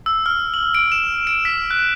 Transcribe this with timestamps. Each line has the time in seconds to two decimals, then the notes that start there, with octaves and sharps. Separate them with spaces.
0.06 E6
0.26 F6
0.54 F#7
0.75 D7
0.92 E7
1.27 D7
1.45 B6
1.71 F#6